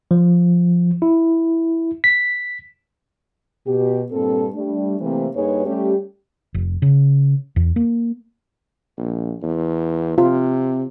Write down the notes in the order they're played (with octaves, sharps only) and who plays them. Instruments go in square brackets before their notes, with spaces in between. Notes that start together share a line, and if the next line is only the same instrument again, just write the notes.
[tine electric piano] F3
E4
B6
[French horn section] B2 G4
G2 A#2 C4 A4
G3 A3 D4
C3 E3 A3 A#3 C4
G2 A#3 D#4 G#4 B4 C#5
G3 A3 C#4 G4
[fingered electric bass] F1
C#3
E2
A#3
[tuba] A#1
E2
[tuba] C3 [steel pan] F4